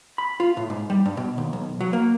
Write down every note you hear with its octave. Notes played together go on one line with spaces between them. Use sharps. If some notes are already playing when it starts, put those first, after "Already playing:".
B5
F4
A2
G#2
G3
G2
B2
D#2
B1
F#3
A#3